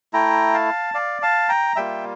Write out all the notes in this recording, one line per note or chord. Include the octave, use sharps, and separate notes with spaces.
A3 E4 G5 A#5
F5 A5
D5 F5
F5 A5
G5 A#5
G3 A#3 F4 E5 G5